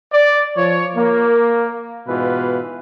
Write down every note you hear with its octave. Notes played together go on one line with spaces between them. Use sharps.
D5
F3 C#5
A#3
G#2 B2 E3 F4 B4